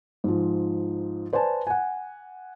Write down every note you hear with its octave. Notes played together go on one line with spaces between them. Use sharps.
G#2 F3
B4 C5 D5 G#5 A5
F#5 G#5